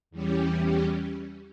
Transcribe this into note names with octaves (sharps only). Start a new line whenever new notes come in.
E2 E3 G3 C#4 G4